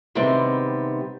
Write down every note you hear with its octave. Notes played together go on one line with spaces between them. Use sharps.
C3 D#3 G3 G#3 B3 C4